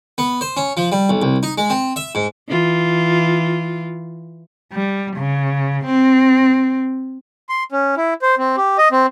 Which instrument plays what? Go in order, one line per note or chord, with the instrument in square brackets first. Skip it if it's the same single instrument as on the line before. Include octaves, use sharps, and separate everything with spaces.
[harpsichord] B3
C5
C#4
F3
G3
B1
C2
D#4
G#3
C4
E5
G#2
[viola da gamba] E3 F4
[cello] G3
C#3
C4
[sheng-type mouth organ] C6
C#4
E4
C5
C4
G4
D#5
C4